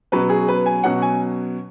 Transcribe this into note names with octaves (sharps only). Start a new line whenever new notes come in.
B2 F#3 C#4 B4
G#4
B4
G#5
B2 F#3 C#4 F#5
G#5